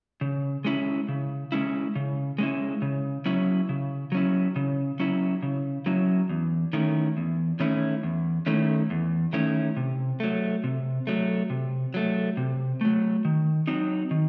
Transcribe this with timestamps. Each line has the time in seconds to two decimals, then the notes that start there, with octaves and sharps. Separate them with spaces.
0.21 C#3
0.65 G#3 C#4 E4
1.08 C#3
1.52 G#3 C#4 E4
1.96 C#3
2.38 G#3 C#4 E4
2.82 C#3
3.25 F#3 C#4 E4
3.69 C#3
4.12 F#3 C#4 E4
4.56 C#3
4.99 F#3 C#4 E4
5.43 C#3
5.86 F#3 C#4 E4
6.29 E2
6.73 D#3 A3 C#4 E4
7.17 E2
7.60 D#3 A3 C#4 E4
8.03 E2
8.47 D#3 A3 C#4 E4
8.90 E2
9.33 D#3 A3 C#4 E4
9.77 C3
10.20 F#3 A3
10.64 C3
11.07 F#3 A3
11.50 C3
11.94 F#3 A3
12.37 C3
12.81 F#3 A3
13.25 D#3
13.67 F#3 C4 D#4
14.11 D#3